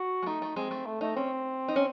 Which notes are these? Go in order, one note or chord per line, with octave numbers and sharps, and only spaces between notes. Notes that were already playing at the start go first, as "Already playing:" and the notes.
Already playing: F#4
G#3
A3 D#4
A3
G#3 C4
A3
A3
A3 D#4
C4 C#4
D#4
C#4